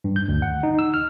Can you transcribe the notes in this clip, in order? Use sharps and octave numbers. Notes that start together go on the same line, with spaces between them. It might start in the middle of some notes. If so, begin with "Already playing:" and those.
G2
G6
D2
F#5
D#4
E6
F6